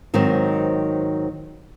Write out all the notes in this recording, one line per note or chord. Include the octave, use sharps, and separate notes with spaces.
G#2 D#3 F#3 C4